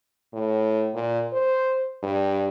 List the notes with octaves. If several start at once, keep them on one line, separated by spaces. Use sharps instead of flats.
A2
A#2
C5
G2